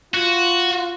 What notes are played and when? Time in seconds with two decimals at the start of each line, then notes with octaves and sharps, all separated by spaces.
0.14 F4 F#4